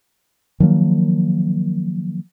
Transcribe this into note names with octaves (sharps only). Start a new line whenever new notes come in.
D#3 F3 F#3 A#3